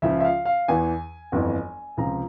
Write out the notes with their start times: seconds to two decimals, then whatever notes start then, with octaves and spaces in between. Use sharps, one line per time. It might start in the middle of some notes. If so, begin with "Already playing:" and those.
0.02 C#2 C#3 F3 E5
0.20 E5
0.25 F5
0.46 F5
0.68 E2 E3 G#5
1.32 G1 F2 E3
1.97 C#2 C3 F3 A#5